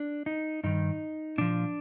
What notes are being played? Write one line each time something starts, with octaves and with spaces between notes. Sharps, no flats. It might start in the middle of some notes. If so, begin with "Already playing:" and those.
Already playing: D4
D#4
G2 D#3 D#4
A#2 F3 D4